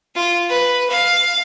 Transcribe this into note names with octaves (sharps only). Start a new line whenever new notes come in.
F4
B4
F5